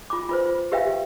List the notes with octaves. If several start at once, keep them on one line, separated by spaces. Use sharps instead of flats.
F4 D6
F4 B4 C5
F4
G4 B4 E5 F5 G5
G4